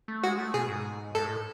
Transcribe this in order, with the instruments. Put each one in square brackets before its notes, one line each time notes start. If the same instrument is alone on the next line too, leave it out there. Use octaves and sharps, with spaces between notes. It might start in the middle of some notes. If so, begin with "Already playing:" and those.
[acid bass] A3
[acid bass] G#3 [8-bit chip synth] F#4
[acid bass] A3
[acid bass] B2 [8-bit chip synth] G#4
[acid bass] G#2
[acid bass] G#2 [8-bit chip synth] A4
[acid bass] A2